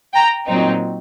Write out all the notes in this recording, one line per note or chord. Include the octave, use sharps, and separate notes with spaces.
G5 A#5
A#2 F#3 C4 D#4